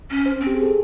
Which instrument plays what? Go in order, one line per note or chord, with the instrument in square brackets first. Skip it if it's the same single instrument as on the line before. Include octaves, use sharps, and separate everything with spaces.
[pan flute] C#4
[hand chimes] C5
[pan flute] C4
[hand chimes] G4
G#4
A4